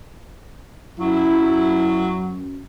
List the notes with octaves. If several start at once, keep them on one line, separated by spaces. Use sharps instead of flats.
F#2 F#3 E4